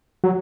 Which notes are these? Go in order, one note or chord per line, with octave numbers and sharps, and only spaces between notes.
F#3